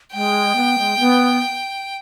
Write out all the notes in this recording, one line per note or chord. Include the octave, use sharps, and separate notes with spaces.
G#3 G5
B3
G#3
B3